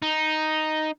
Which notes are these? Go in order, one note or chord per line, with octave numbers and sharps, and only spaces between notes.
D#4